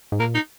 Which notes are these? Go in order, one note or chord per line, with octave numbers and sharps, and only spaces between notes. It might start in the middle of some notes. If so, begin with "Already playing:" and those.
G#2
A#2 A#3
D#4